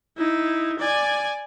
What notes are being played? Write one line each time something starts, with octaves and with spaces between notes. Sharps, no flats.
D#4 E4
D5 G#5